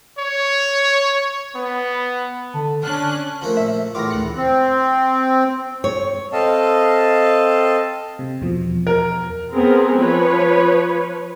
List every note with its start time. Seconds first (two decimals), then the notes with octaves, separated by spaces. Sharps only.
0.18 C#5
1.55 B3
2.54 D3 A5
2.83 C#4 D4 F6 F#6
3.42 F3 A3 A#3
3.57 A#2 E5
3.95 E2 A2 F4 D6 A#6
4.11 D2 F#6 C#7
4.36 C4
5.84 C#5
6.32 C4 A4 D#5 F5 A5
8.19 C3
8.41 E2 B2 F3
8.87 A#4
9.53 B3 C4 G#4 A#4
9.98 F3 B4 C#5